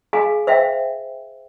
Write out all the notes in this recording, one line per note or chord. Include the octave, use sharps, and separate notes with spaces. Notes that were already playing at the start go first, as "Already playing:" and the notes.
G#4 F5 G#5
C5 E5 F5 G5